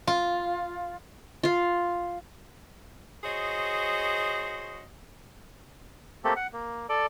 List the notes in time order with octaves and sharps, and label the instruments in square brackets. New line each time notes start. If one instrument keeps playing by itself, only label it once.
[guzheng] F4
[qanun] F4 F5
[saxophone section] F#4 G#4 C5 C#5 D#5
[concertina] A3 A#3 C4 G4 A4
F#5
A#3
A4 D5